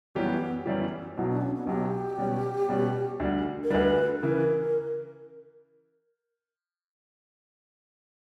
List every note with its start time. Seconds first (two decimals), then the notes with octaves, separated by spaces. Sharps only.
0.15 F#2 E3 G3 B3 C#4 G4
0.66 F#2 E3 G3 C#4 G4
1.16 B1 B2 F#3 E4
1.29 D4
1.41 C#4
1.55 B3
1.67 B1 B2 F#3 G4
2.18 B2 G3 C#4
2.69 B2 G3 C#4
3.20 D2 D3 G3
3.63 A#4
3.70 D2 D3 G3 B4
4.21 C#3 E3 A#4